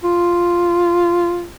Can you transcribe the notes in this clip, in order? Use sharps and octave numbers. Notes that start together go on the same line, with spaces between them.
F4